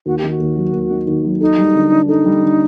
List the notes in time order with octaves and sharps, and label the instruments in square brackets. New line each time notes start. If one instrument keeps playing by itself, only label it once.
[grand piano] D#2 [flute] F#4
[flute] G4
[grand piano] D#3
[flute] F#4
[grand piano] D#2
F#3
D#2
D#3
D#2
F#3
[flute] D#4 [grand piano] A4
[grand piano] G3
D3
D4
[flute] D#4 [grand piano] A4
[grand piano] G3
D3